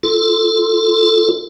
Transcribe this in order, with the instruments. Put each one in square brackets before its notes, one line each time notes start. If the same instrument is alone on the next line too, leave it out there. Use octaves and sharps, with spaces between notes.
[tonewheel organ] F4 A4